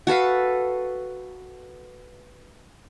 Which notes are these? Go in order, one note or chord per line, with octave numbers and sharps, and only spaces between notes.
F#4 A4 B4 F5